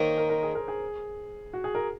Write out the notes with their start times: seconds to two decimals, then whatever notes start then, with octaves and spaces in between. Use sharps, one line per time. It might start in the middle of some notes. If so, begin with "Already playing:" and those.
Already playing: D#3 A#3 D#4 C5 C#5
0.18 A#4
0.29 A#4
0.43 G#4
0.55 A#4
0.68 G#4
1.53 F#4
1.64 G#4
1.75 A#4